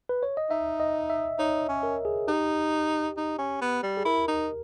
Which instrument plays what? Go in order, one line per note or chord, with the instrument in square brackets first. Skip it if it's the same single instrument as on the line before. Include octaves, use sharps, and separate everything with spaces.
[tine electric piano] B4
C#5
D#5
[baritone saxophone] D#4 [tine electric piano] E5
[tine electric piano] D#5
E5
[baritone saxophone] D#4 [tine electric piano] C#5
[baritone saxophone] C#4
[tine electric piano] A#4
G#4
[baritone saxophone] D#4 [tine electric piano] G4
[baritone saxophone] D#4
C#4
B3
G3
[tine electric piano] G#4
[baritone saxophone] E4 [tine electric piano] A#4
[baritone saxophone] D#4